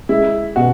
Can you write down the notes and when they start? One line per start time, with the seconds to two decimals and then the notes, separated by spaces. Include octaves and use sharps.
0.09 G#3 E4
0.56 B2 F#4